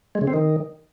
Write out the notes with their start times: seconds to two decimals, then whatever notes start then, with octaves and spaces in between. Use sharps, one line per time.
0.15 G#3
0.21 C#3
0.27 C4
0.34 D#3